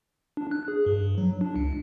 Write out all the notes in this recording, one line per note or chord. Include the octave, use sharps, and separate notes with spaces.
D4
F#6
G#4
G2
F#3
D4
C#2